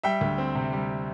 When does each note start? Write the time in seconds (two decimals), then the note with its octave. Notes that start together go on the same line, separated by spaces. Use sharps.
0.03 G3 E5 G5
0.21 D2
0.38 C4
0.55 C3
0.73 G3